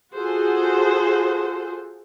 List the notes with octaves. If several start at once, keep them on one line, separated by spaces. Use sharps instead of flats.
F4 F#4 G#4 A4 C5